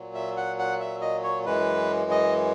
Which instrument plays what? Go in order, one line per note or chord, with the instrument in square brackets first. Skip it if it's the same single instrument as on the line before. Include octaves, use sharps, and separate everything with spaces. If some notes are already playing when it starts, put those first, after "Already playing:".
Already playing: [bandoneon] A#2 F#3
E5
F#5
F#5
E5
D#5
C#5
F#2 E3 G#3 B4
D#5